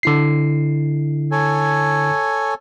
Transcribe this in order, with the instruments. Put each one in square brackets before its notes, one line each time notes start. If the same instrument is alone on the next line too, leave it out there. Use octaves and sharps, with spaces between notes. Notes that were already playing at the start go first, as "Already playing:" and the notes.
[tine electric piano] D3 E4 C7
[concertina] A4 C#5 G#5